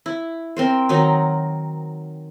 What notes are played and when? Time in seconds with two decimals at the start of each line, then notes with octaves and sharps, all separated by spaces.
0.06 E4
0.57 C4 A#4 C5
0.89 D#3 F#3 D#4